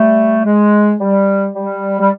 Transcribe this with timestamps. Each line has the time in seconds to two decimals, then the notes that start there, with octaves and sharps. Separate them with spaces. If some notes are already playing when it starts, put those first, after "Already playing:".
Already playing: G3 A3
0.45 G#3
1.00 G3
1.55 G3
1.99 G3